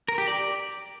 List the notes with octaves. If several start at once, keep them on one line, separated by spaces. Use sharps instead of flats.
A#4
G4
D5